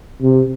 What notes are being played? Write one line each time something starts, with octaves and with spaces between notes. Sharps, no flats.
C3